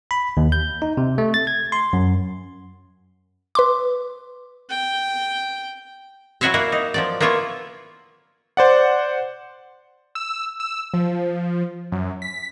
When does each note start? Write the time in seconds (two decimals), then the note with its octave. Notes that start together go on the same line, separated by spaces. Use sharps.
0.11 B5
0.37 D#2
0.52 G6
0.82 D#4
0.97 C3
1.18 A3
1.34 A6
1.47 G#6
1.72 C6
1.93 F#2
3.55 B4 C6 D6
4.70 G5
6.41 F#3 E4 F#4 C#5 E5 F5
6.54 A#3 E4 F#5
6.72 D#4
6.94 F3 F#3 D5
7.20 A#3 B3 E4 F4 C#5
8.57 C5 D5 F#5
10.15 E6
10.60 E6
10.94 F3
11.92 F#2
12.22 B6